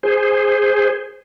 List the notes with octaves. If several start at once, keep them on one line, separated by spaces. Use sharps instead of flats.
G#4 C5